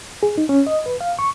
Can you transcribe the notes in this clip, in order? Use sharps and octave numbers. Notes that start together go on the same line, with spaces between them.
G#4
D#4
C#4
D#5
B4
F5
C#6